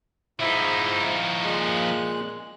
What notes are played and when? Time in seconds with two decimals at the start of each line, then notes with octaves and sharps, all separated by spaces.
0.40 G#2 F3 D#4 E4 E5
1.43 A#2 G#3 F#6